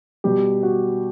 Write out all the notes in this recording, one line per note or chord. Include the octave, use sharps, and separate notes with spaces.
B2 G3 G4
F#4